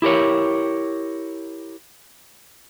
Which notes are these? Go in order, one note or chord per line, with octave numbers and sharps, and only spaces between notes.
E4 G4 A#4 C#5